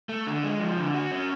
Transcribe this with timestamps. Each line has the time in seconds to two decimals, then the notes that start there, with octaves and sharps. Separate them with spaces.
0.09 A3
0.27 D3
0.44 G#3
0.60 F3
0.78 D3
0.94 F#4
1.11 C#4